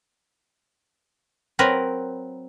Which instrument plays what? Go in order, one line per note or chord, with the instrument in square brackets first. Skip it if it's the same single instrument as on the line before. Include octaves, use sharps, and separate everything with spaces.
[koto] F#3 C4 A#4 B4